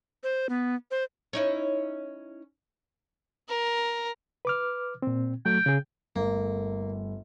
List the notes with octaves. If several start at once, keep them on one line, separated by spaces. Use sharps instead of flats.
C5
B3
C5
C#4 D#4 E4
A#4
B4 D6 F6
A#2 C4
F#3 A3 G5
C#3 G#4
G1 A3 A#3